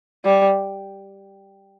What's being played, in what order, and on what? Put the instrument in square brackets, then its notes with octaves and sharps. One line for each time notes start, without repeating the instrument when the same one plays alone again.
[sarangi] G3